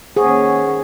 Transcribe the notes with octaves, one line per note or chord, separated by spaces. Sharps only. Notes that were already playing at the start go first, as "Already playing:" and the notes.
D#3 A#3 C#4 G#4 C5 F#5 C#6